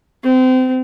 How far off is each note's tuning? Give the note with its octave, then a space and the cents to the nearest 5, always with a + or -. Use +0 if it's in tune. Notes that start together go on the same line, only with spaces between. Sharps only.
C4 -30